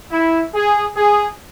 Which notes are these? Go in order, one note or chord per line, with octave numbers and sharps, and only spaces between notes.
E4
G#4
G#4